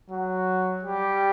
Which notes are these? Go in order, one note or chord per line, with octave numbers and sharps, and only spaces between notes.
F#3 F#4
G3 G4